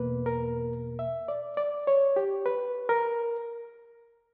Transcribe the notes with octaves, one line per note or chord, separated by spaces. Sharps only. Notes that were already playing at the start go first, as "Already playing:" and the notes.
Already playing: E2 B2 A#3 B4
A#4
E5
D5
D5
C#5
G4
B4
A#4